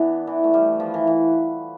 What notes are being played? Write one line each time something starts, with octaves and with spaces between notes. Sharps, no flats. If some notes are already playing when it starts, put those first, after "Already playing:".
Already playing: E3 B3 D4
E3
A3
G3
F3
E3
E3